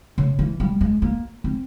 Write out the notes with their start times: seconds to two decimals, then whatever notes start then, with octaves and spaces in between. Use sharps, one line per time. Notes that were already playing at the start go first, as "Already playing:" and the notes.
0.18 C#3
0.39 E3
0.60 G3
0.81 G#3
1.02 A#3
1.44 C4